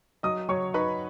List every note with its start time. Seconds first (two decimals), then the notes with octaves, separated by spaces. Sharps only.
0.23 F#3 D#5 D#6
0.49 F#3 C#5 C#6
0.74 D#4 B4 B5